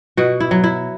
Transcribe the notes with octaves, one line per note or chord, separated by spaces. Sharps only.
B2 F#4
E4
F#3
E4